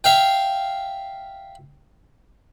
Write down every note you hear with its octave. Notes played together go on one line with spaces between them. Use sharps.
E5 F5 G5